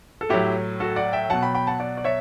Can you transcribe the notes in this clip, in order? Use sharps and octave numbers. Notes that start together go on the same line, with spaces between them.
A4
A2 F#3 E4 G4
F#4 A4
D5 F#5
E5 G5
B2 F#3 F#5 A5
G5 B5
G5 B5
F#5 A5
D5 F#5
D5
C#5 E5